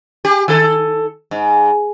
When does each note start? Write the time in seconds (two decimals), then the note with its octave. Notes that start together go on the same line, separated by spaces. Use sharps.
0.25 G4
0.48 D#3 A4
1.31 G#2